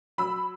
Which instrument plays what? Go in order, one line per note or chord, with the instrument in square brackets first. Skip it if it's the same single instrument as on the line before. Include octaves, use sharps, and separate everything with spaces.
[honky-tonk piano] F#3 B5 E6